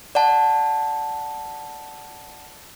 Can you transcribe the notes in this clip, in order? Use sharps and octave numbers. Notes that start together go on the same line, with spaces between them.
D5 F#5 A5